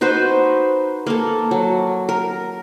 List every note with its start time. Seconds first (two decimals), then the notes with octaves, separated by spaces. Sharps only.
0.01 D#4 F#4 B4 C5
1.06 A#3 A4
1.51 F#3
2.09 A#4